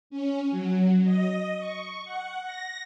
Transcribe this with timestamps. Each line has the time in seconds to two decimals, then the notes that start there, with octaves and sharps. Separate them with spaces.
0.10 C#4
0.51 F#3
1.04 D#5
1.59 C#6
2.05 F#5
2.43 A#6